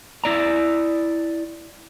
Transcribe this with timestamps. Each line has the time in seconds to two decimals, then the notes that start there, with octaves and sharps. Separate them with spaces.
0.24 E4 D5 A#5